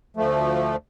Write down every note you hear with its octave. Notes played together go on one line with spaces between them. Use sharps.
D2 F3 A3